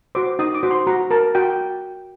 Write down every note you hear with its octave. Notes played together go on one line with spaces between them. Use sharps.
F#4 C5 D6
D#4 D#6
D6
F#4 C5
C6
F#4 A#5
A#4 A5
F#4 G5